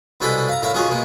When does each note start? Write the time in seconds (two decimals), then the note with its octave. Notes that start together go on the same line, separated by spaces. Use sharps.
0.21 C2 B2 G#3 D4 A4 B5
0.49 F5 A#5
0.62 A2 A#4 E5 F5
0.74 D#3 C#4 F4 F#4 G#4
0.88 B2 G#3 A#3